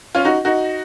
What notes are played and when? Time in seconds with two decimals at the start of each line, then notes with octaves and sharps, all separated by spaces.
0.15 C#4 F4
0.25 D#4 F#4
0.45 D#4 F#4